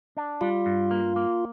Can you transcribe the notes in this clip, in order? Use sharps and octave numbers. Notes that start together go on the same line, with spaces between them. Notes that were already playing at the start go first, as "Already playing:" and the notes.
D4
G3 F4
G2
A#3
A#3